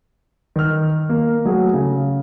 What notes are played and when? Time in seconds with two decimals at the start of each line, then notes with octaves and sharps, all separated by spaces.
0.56 D#3 F6
1.09 A#3
1.45 F#3 A3 G#4
1.74 C#3